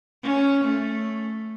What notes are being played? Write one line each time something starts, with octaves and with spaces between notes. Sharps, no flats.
C#4
A3